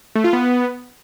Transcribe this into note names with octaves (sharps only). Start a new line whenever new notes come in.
A3
F4
B3